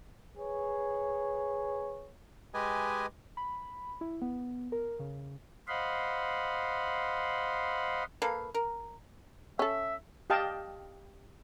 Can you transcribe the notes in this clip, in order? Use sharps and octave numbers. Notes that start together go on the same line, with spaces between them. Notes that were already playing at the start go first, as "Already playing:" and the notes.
G#4 B4 C#5
G#3 G4 B4 D#5 G#5
B5
E4
B3
A#4
C#3
C5 D#5 F5 F#5 B5 C6
A#3 A4 B4 F5
A#4
C#4 A4 E5
G4 D#5 F5 G5 A5